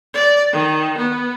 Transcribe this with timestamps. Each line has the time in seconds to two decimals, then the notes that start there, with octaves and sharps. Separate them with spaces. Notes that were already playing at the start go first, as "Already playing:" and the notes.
0.14 D5
0.53 D#3
0.98 B3